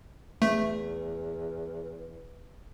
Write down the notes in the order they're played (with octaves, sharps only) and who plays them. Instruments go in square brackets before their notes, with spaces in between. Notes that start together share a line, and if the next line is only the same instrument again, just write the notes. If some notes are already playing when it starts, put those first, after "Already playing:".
[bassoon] E2 [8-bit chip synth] A3